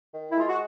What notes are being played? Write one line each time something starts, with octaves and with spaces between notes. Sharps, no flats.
D#3
E4
G#3 F4
F#4